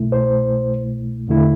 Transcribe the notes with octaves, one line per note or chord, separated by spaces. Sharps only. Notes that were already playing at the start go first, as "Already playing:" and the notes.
Already playing: C2 B2 A3 E4
C5
E2 D3 A3 E4